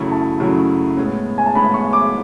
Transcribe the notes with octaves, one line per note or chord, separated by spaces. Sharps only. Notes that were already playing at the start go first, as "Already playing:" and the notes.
Already playing: F#2 C#3 F#3 A3 E4
A5
F#2 C#3 F#3 A3 E4
A2 G#3 B3
G#5
A5
A2 G#3 B3 B5
C#6
D6